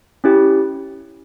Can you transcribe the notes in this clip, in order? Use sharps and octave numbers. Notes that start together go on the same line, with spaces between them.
C#4 E4 G4